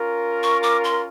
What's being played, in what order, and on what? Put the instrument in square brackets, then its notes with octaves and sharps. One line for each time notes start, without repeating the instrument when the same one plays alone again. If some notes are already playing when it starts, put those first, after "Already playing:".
Already playing: [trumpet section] C#4 F4 A#4
[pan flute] C#6
D6
C6